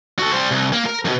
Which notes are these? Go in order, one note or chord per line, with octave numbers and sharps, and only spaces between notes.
F#4 A4
G3 C5
C2
A#3
A#4
F2 B2